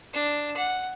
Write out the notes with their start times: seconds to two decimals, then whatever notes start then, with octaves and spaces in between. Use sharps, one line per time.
0.13 D4
0.56 F#5